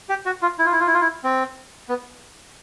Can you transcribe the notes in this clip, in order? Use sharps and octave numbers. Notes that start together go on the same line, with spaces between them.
G4
F#4
F4
E4
F4
E4
F4
E4
F4
E4
C4
B3